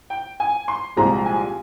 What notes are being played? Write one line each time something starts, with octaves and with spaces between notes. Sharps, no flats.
G5
G#5
C6
C2 A#2 F3 G#3 A#5
G#5